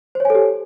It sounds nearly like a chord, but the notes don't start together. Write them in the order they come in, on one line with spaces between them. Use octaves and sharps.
C5 C#5 G#5 A4 G4